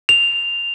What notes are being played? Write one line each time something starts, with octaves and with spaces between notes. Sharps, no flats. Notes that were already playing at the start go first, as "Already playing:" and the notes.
F7